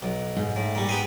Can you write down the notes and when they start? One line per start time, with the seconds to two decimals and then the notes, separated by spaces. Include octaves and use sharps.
0.02 B1
0.37 G#2
0.56 A2
0.75 A#2 G3
0.89 B3 G4 G#4